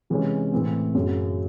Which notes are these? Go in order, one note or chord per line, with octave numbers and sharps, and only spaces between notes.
C3 E3 G#3 C#4
A2 E3 C4
F#2 C#3 F#3 C#4